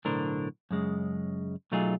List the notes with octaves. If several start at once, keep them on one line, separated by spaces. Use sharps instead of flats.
B1 A2 D3 D4 A#4 C5
F#2 C#3 G#3
B1 F#3 A3 D#4 F4 G#4